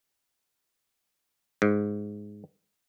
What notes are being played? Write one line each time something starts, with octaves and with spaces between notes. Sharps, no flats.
G#2